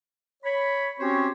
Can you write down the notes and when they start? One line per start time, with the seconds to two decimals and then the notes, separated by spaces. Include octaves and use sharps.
0.43 C#5 B5
0.99 C4 C#4 F#4 G4 C5 C#5